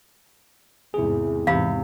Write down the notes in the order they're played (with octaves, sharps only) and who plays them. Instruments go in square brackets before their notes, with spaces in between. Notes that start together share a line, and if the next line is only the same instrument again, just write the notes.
[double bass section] E2 G#2 C3 [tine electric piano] E4 G#4
[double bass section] E2 G#2 [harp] C3 [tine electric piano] E3 C4 B5 [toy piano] F5